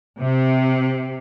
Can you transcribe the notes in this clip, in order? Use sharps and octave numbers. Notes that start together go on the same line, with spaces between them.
C3